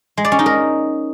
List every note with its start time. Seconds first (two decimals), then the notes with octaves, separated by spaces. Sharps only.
0.17 G#3
0.25 D5
0.32 C#4
0.39 D#4
0.46 A#4